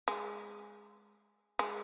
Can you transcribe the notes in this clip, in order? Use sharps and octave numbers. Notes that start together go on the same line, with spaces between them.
G#3
G#3